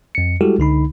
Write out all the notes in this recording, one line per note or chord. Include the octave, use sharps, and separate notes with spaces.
F2 C#7
G3 G#3 E4 F#4 G4 A4
C#2 D3 D#4 B5